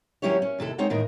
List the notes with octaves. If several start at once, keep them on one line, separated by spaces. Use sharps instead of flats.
D#2 F#3 C#4 E4 G4 C#5
C#4
D#2 C3 E4 A4
G#3 C4 D#4 C#5 F#5
E2 A2 D#3 D#4 A#4